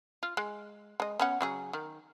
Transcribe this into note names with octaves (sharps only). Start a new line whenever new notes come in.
F4
G#3
G#3 D#5
B3 C#4 F#5
C#3 F#3 G#4
D#3